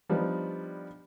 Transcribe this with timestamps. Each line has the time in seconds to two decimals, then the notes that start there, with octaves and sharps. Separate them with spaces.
0.09 F3 G3 B3 D4 D#4